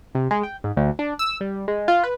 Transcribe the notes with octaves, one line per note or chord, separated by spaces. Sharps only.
C3
G#3
G5
G#2
D2
D4
E6
G3
G#3
F4
B4